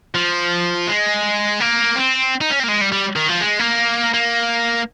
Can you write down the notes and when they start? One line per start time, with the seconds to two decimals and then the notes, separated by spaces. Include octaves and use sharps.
0.15 F3
0.88 G#3
1.60 A#3
1.96 C4
2.41 D#4
2.51 C#4
2.60 C4
2.64 A#3
2.68 G#3
2.81 G3
2.92 G3
3.16 D#3
3.29 F3
3.41 G#3
3.59 A#3
4.14 A#3